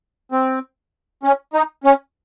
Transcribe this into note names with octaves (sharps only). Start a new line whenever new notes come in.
C4
C#4
D#4
C#4